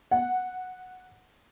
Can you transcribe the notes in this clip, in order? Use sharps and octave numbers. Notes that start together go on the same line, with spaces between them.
F#5